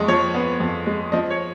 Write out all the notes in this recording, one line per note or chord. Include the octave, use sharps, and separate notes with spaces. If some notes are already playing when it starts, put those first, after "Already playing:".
Already playing: F2 G#3 D#5 C#6
F3 C#5
B3
F2
G#3
F3 D#5
C#5